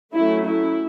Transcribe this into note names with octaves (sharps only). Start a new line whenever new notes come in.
F#3 A3 C#4 E4
E4